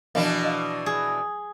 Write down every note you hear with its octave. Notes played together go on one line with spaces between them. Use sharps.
B2 E3 F3 D4 A#4 F5
D#5 F5
G#4